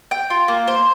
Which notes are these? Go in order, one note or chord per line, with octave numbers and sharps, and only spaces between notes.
G5
F4
A#3
C5